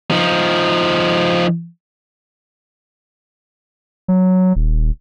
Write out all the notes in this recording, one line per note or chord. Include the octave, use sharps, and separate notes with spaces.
F3 D#4
F#3
D#1